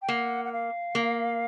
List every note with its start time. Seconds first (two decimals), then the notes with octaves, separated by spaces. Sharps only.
0.02 G5
0.08 A#3 F#5
0.45 F#5
0.52 F5
0.95 A#3